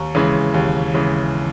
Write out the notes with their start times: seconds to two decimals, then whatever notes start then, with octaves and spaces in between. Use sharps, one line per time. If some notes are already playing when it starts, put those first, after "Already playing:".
Already playing: D#2 A#5 C#6
0.15 C#3 E3 G#3
0.54 D#2
0.94 C#3 E3 G#3